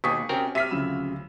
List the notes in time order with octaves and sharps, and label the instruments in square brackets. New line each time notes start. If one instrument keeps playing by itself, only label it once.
[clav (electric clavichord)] D#2 B2 [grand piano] G#4 [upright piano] C#6 D#6 B6
[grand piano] C3 C#4 G5 [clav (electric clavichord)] C4 A#4 [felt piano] F#4
[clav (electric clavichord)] C3 [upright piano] E5 F6 [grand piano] B6 D#7
[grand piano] D2 B5 E7 [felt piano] C#3 F3 F#3